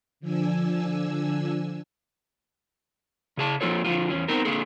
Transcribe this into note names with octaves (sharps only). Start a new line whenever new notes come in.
D3 F3 D4 G#5 E6
C#3 G#4 A5
F3 A#3 F4 A4 C#5
D3 F3 G3 A#3 F4
E2 C#4
B3 C4 D#4 A#4
D3 A#3 G#4 A4